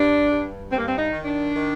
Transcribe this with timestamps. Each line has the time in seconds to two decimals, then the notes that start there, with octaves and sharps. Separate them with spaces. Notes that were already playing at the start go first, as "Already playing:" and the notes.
Already playing: G2 D4
0.30 G2
0.71 G2 C4
0.78 A#3
0.87 C4
0.98 D#4
1.11 D#3
1.25 D4
1.53 D#3